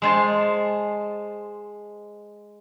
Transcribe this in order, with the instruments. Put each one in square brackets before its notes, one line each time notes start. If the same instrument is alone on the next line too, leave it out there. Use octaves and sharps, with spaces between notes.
[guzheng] G#3 C5 A5